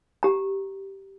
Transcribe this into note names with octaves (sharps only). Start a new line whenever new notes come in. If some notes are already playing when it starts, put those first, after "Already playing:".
G4 A#5